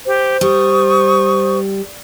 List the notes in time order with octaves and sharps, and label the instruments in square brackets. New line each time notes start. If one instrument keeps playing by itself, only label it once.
[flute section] G4 [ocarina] C5
[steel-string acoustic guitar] G3 [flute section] C#6 D#6